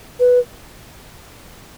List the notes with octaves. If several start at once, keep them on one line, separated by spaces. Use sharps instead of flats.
B4